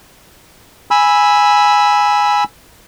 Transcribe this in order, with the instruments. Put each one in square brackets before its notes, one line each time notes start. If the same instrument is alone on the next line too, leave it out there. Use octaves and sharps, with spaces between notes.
[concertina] G#5 B5 E6